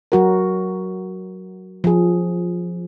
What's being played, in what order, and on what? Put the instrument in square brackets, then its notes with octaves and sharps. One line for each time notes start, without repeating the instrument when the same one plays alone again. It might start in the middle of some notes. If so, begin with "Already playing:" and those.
[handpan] F#3 F#4 A#4
F3 G#4